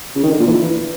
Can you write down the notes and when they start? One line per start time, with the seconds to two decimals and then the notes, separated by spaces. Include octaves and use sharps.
0.15 C#3
0.23 D#3
0.31 D3
0.39 A#2
0.47 E3